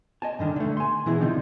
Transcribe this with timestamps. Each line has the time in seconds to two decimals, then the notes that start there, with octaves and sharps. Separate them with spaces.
0.22 D#5 G#5 A5
0.39 G2 D3 D#3
0.56 D3 A3
0.77 G#5 C6
1.06 B2 E3 E4 G#4
1.21 D3 D#3 F3 C4 D#4